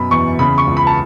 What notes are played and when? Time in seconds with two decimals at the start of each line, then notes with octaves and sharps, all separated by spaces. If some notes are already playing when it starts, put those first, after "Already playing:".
Already playing: F#2 B2 B5
0.11 E2 C#6
0.39 C#3 B5
0.58 C#6
0.67 C#2
0.77 B5
0.87 A5